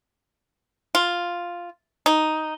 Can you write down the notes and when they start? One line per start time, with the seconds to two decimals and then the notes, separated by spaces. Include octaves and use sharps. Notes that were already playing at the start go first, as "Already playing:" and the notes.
0.95 F4
2.06 D#4